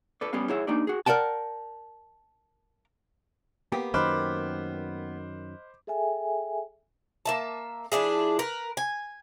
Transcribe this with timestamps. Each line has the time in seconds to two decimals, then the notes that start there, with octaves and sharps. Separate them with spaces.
0.21 A4 B4 D5
0.33 G3 B3 C#4 B4 F5
0.49 E4 G#4 C#5 E5 F#5
0.67 A#3 D4 D#4 G4 D5
0.87 F#4 G#4
1.06 A#4 D5 F#5 G5 A5
3.72 A#3 B3 G4
3.94 F#2 D#3 C5 D#5 B5 D6 F6 F#6
5.87 G#4 A4 E5 G5 G#5
7.26 A#3 E5 A5
7.92 F3 D4 E4 G#4
8.39 A#4 B4
8.77 G#5